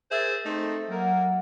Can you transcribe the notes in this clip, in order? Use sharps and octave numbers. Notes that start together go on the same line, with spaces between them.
G#4 A#4 C5 E5 E6 A6
A3 C4 D#4
F#3 A#3 F#5